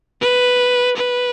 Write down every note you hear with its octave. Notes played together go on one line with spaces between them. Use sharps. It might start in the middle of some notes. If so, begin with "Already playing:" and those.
B4
B4